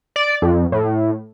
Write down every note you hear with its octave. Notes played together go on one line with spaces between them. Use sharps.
D5
F2
A2